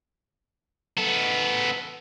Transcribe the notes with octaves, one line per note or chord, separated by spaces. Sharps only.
B3 A4